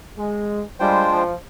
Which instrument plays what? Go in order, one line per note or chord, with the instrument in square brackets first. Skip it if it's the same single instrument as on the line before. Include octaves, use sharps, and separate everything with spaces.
[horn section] G#3
[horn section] G3 [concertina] G#3 D4 F4 C5 G5
[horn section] F3